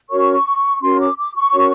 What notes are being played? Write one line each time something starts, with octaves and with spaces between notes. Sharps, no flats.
C#4 F#4 A#4 C#5 C#6
C#4 F#4 A#4 C#5 C6
D6
D6
C#6
C#4 F#4 A#4 C#5